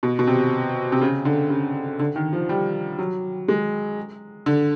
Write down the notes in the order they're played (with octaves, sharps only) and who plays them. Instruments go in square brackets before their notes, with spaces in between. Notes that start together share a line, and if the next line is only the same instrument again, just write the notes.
[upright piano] B2
B2
C3
C3
C#3
D3
C#3
D3
D#3
F3
G3
F#3
G#3
D3